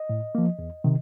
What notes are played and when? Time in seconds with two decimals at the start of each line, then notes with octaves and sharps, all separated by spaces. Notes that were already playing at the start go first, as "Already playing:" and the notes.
Already playing: D#5
0.09 A2
0.35 F3 A#3
0.59 E2
0.84 C3 D#3